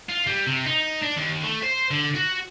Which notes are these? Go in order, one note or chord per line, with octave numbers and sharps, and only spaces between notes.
F4
G3
C3
D#4
D4
D#2
A3
C5
D3
F#4